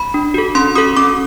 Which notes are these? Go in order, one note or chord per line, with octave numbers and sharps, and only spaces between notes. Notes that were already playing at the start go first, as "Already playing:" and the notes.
Already playing: B5
D4
F#4 A4
C#4 C6
F#4 A4 D#6
C#4 D6